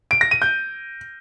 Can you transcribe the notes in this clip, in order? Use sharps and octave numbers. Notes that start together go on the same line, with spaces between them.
D7
A#6
D#7
G6